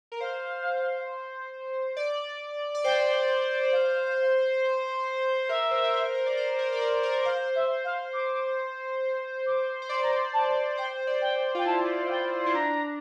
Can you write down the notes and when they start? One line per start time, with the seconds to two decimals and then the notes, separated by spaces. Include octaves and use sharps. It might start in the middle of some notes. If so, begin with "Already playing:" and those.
0.12 A#4
0.20 C5 F5
1.97 D5
2.75 D5
2.84 C5 G5
3.72 F5
5.48 A#4 E5
5.71 C5
5.84 A#4
5.93 C5
6.15 A#4
6.26 D5
6.37 C5
6.58 A#4
6.72 D5
6.81 C5
7.03 A#4
7.25 C5 F5
7.55 E5
7.84 F5
8.13 D6
9.46 D6
9.82 C5
9.89 D5 C6
10.02 A#5
10.14 C6
10.33 A5
10.78 C5 G5
11.07 D5
11.21 G5
11.55 F4 G5
11.66 E4 A5
12.05 F5
12.10 G5
12.44 E4 C6
12.54 D4 A#5